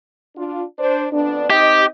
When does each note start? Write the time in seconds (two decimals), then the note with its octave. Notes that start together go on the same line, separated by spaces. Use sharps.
0.36 D4 F4
0.79 D4 C5
1.12 F2 B3 D4
1.50 C4 D#4 G4 D#5